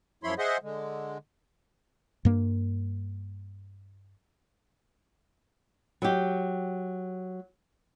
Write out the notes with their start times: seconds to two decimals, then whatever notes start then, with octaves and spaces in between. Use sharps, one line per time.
0.24 F#2 F3 E4 C#5 B5 C6
0.39 G#4 C5 D#5 E5 F#5 C6
0.63 D3 G#3
2.25 G2 A#3
6.02 F#3 G4